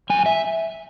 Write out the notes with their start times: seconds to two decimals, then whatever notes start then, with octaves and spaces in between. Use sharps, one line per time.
0.10 F#2 G#5
0.26 E5